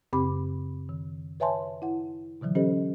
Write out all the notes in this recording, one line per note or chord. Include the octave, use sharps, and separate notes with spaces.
F#2 C#3 C4 G4 B5 D6
D#3
B4 C#5 E5 G#5 A5 C6
E4 F#5
B2 D3 E3 F#3
C#4 G4 A4 C5 D#5